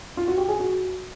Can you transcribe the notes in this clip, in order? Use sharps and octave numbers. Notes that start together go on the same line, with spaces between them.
F4
F#4
G4
G#4
F#4